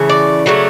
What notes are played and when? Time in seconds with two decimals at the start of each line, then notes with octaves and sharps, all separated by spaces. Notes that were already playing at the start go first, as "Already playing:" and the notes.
Already playing: C#3 E3 A3
0.09 D5
0.46 C#3 F#3 A3